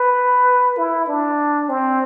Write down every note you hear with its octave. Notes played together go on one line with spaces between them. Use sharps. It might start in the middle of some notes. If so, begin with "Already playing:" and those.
Already playing: B4
E4
D4
C4